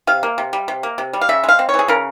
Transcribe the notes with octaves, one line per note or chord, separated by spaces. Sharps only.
C3 F5
A#3
C3
G3
C3
A#3
C3
G3
F5
C#3 E5
G#3 F5
C4
C#5
E3
G#4
C#3 A#4